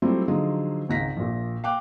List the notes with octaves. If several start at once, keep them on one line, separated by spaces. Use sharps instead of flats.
F#3 G3 A3 C4 E4 F4
D3 F3 F#3 D#4 F4 G#4
G#1 C#2 A#6 B6
A#1 A#2
F5 G5 D6 F#6